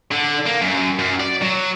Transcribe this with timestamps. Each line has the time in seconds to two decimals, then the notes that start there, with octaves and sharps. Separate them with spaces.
0.12 D3
0.47 A#3
0.62 F#2
0.99 F#2
1.20 D5
1.42 F#3